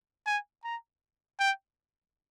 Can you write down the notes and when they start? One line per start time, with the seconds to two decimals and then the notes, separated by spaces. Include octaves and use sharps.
0.26 G#5
0.64 A#5
1.39 G5